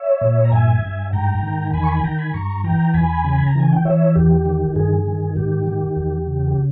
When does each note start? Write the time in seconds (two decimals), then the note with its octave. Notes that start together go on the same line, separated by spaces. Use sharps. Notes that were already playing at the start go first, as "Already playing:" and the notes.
Already playing: C#5 E5
0.21 A#2
0.45 A#5
0.52 G2 E5 G#5
0.82 G2
1.13 G#2 G5 A#5
1.43 D#3
1.74 E2 G#5 B5
1.83 C#6
1.88 G#5 B5
2.04 D#3 G5 A#5
2.18 G#5 B5
2.33 G2 A#5 C#6
2.64 E3 G5 A#5
2.94 E2 G#5 B5
3.25 C#3
3.33 B5
3.47 A#5
3.55 E3 G#5
3.72 G5
3.85 E3 C#5 E5
4.15 E2 G4
4.46 D#3
4.76 G2 G#4
5.07 D#3
5.36 G#2 G4
5.67 D#3
5.96 E2
6.27 C#3
6.48 G4